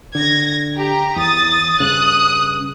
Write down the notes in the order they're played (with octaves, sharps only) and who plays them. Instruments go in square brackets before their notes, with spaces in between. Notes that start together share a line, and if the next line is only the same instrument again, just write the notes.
[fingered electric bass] D3 [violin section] G#6 A#6
[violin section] G4 A#5
[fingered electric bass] E2 [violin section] D#6 A6
[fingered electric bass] G2 C#3 [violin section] D#6 F#6